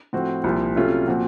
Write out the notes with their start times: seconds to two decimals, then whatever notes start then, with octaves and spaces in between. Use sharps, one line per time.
0.13 A2 F3 C4 F#4
0.44 C2 A#2 F3 C4
0.76 C3 F#3 A3 C#4 F4
1.08 A#2 F3 C4 F#4